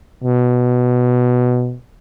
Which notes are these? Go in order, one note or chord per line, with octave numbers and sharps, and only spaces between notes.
B2